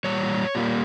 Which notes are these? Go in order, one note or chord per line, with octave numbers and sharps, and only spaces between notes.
A#2 G3 C#5
A#2 G3 A#3